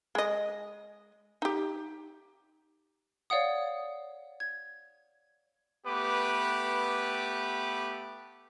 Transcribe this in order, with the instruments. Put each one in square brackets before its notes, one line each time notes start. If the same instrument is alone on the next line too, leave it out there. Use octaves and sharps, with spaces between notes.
[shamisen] G#3 D#5
D#4 G4
[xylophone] C#5 D5 F5 F#5 D#6
G#6
[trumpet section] A3 B3 G4 B4 D6